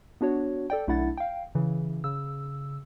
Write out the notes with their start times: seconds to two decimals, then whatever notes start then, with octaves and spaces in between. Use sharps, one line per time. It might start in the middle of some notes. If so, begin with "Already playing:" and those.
0.21 B3 D4 F#4 C#5
0.70 A4 D5 G5
0.87 B1 A3 D4 E4 F#5 A6
1.18 F5 G5
1.55 C#3 E3
2.04 C#3 E6